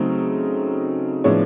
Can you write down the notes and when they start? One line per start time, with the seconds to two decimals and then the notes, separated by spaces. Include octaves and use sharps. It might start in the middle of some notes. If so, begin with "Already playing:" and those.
Already playing: C#3 F#3 A3 C4 D#4
1.24 A2 F3 G#3 B3 D4 C#5